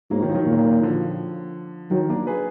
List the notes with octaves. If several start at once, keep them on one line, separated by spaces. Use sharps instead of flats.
G#2 F#3 A#3
D#3 F#3
F3
D#3 F#3
A#2
D3 F3
D#3 F#3
A#3 D4
G#4 B4